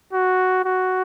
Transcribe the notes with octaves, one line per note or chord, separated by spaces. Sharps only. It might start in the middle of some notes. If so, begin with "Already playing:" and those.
F#4
F#4